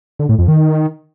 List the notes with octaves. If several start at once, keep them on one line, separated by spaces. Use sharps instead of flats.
D3
A2
F2
D#3